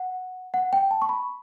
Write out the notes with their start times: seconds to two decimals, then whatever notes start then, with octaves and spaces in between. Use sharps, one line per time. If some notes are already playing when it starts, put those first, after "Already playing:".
Already playing: F#5
0.54 F#5
0.73 G5
0.91 A5
1.02 C#6
1.09 B5